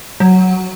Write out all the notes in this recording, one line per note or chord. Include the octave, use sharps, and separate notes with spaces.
F#3